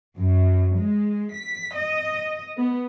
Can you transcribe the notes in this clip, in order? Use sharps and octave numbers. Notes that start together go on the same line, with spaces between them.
F#2
G#3
B6
D#5
B3